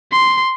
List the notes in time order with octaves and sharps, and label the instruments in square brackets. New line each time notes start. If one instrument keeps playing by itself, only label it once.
[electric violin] C6